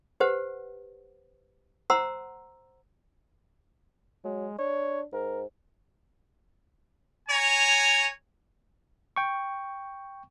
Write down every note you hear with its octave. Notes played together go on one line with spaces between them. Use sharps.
G4 B4 C5 F#5
C5 F#5 A#5 C6 E6
F#3 G#3
D4 C#5
G#2 A#4
C#5 G#5 A#5
G5 C#6